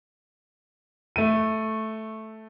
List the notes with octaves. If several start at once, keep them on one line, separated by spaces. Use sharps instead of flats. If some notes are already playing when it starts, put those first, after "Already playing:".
A3 D#7